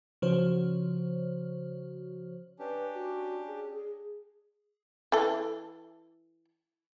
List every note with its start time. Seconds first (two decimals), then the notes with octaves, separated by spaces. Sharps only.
0.22 C#3 F3 F#4 C5 C#5
2.59 C#4 D4 G4 B4
2.94 F#4
3.47 G#4
3.74 G#4
5.12 E3 A4